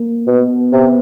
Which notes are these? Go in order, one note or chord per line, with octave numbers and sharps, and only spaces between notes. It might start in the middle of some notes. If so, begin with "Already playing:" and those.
Already playing: A#3
B2 B3
C3